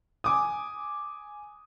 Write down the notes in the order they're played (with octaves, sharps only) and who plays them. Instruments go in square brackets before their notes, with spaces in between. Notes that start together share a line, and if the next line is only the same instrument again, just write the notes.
[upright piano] G#5 D6 D#6